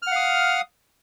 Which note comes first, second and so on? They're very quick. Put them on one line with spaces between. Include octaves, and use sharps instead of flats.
F6 F#5 F5 D#6